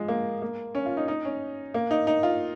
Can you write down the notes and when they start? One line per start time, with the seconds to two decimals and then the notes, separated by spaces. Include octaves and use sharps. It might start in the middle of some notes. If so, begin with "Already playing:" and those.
Already playing: F3 G#3
0.08 A#3
0.42 A#3
0.75 C#4
0.86 F4
0.97 D#4
1.08 D#4
1.25 C#4
1.74 A#3
1.91 D#4
2.07 D#4
2.23 F4